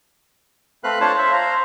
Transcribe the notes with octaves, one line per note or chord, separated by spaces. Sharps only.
A3 C4 B4 F5 F#6
D4 F4 C5 C#5 A5
C5 E5
C5 F5 A#5